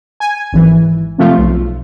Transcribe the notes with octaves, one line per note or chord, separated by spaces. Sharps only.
G#5
G#1 E3
C3 F3 A3 F4
B1